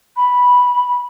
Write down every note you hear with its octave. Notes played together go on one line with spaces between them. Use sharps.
B5